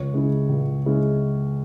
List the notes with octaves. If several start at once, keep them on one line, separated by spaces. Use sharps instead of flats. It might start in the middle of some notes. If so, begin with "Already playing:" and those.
Already playing: C#2 C#5
C#3 G#3 C#4 E4
C#2
C#3 G#3 C#4 E4